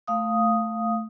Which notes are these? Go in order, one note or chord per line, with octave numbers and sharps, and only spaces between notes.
A3 F5 D#6